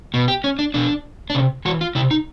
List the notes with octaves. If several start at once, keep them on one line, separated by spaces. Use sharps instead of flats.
B2
G4
C#4
D4
B2 D4
D4
C3 C#4
E3 F#4
F4
C3 E4
D#4